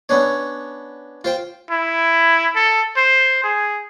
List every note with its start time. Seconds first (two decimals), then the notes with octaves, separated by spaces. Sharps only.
0.09 B3 C#4 D4 C#5
1.24 F4 C5 G5
1.71 E4
2.56 A4
2.97 C5
3.44 G#4